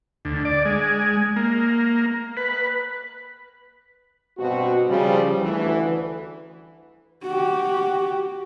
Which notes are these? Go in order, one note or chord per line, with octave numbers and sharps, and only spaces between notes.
D2
D5
G#3
A#3
B4
G2 B2 C4 F#4
C#3 F3 G3
D2 E3
F#4 G4